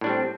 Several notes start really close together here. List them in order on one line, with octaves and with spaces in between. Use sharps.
A2 D4 G3 C4